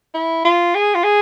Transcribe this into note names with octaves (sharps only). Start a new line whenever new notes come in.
E4
F4
G#4
F4
G#4